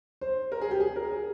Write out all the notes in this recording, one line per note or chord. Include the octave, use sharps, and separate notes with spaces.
C5
A#4
G#4
G4
G#4
A#4
G#4